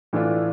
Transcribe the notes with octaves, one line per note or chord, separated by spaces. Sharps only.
A2 E3 A3 D4 F4